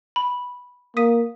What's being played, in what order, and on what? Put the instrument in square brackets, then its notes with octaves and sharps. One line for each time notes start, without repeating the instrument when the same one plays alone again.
[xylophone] B5
[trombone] A#3 [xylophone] D#6 B6 D#7